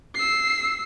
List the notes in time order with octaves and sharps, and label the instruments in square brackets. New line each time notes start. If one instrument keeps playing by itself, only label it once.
[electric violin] E6 C7